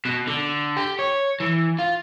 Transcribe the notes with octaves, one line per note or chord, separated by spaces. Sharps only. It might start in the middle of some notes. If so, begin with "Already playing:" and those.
B2
D3
G4
C#5
E3
F4